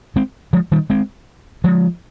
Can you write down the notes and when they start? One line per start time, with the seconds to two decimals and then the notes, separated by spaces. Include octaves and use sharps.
0.16 G#3 C4
0.53 F3 G#3
0.72 D#3 G3
0.90 G#3 C4
1.64 F3 G#3